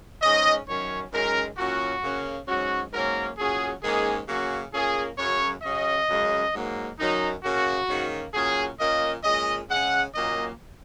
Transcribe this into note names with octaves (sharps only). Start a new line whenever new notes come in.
G#2 G#3 C#4 D#5
F#2 D#3 F#3 C#4 C#5
F#2 D#3 G#3 C#4 A#4
A#2 F#3 C#4 F#4
C#3 A#3 C#4
G#2 F#3 C#4 F#4
G#2 F#3 A#3 C#4 A#4
A#2 F#3 C#4 G#4
G#2 D#3 A#3 C#4 G#4
C#3 F#3 A#3 C#4 F#4
A#2 A#3 C#4 G#4
F#2 C#3 F#3 C#5
C#3 F#3 C#4 D#5
F#2 C#3 G#3
G#2 F#3 A#3
F#2 D#3 F#3 C#4 D#4
C#3 A#3 C#4 F#4
G#2 D#3 A#3 C#4
A#2 F#3 C#4 G#4
A#2 A#3 C#4 D#5
A#2 G#3 C#4 D#5
C#3 G#3 C#4 F#5
A#2 F#3 A#3 C#4 D#5